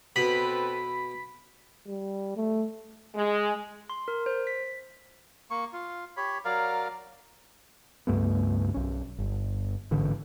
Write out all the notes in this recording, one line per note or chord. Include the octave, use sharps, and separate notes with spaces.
B2 C4 A4 B4 B5 B6
G3
A3
G#3
C6
A#4
C5
B6
A#3 C#6
F4
G4 C#5 B5
F#3 A#4 D5 F5
C#2 G2 A3 B3
B1 C#4
G1
A1 G#2 D3 E3